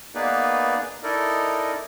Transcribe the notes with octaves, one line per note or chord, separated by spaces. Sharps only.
A#3 B3 D#4 G#4 B4 D5
D#4 E4 A4 A#4 D5 D#5